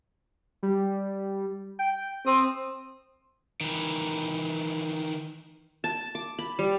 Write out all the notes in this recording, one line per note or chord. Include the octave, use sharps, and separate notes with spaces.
G3
G5
C4 D#6
D#3 E3
A5
D6
B5
G3